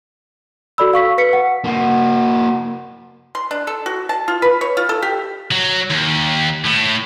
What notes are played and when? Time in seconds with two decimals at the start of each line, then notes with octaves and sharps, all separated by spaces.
0.78 F#4 A4 D5 B5 E6
0.93 F5 C#6 B6
1.18 B4 B6 C#7
1.33 F#5
1.64 A#3 F#4
3.35 C6
3.51 D4
3.67 A4
3.86 F#4
4.09 A5
4.28 F4
4.42 B4
4.61 C#5
4.77 F4
4.89 A4
5.02 G4
5.51 F#3
5.91 D#2
6.65 A2